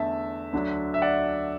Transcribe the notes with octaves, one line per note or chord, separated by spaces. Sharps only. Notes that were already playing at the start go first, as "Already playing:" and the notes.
Already playing: E2 D3 A3 E5 A5
D2 D3 F#3 D4
E5
D5 F#5